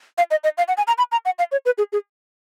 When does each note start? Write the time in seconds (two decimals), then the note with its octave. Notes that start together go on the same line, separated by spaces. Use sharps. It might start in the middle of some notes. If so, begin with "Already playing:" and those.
0.18 F5
0.31 D#5
0.44 D#5
0.58 F5
0.68 F#5
0.77 G#5
0.87 A#5
0.98 B5
1.12 A#5
1.25 F#5
1.39 F5
1.52 C#5
1.66 B4
1.78 G#4
1.93 G#4